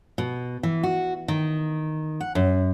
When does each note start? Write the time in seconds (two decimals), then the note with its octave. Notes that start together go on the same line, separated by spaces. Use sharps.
0.18 B2
0.63 E3
0.83 F#4
1.28 D#3
2.20 F#5
2.35 F#2